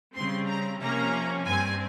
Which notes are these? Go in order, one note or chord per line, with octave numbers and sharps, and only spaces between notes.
C#3 G3 C4 C6
A#5
C3 F3 A#3 C#4 A#5
G2 G3 C4 G#5